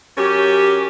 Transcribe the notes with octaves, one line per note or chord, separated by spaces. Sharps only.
F#2 C#4 G4